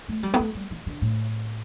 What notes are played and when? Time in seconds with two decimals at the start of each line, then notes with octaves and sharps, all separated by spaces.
0.09 A3
0.23 G3
0.34 B3
0.39 A3
0.55 G3
0.70 E3
0.86 D3
1.01 A2